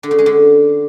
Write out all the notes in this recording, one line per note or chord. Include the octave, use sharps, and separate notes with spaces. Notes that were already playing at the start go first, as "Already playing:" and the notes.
D3
C#3
G#3
D3